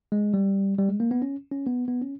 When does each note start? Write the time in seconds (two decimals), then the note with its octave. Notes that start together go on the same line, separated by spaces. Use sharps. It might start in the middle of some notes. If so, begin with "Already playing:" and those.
0.12 G#3
0.34 G3
0.79 G3
0.89 G#3
1.00 A#3
1.11 B3
1.22 C#4
1.51 C#4
1.66 B3
1.88 B3
2.01 C#4